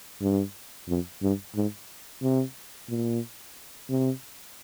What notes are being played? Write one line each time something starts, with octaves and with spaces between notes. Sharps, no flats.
G2
F2
G2
G#2
C3
A#2
C3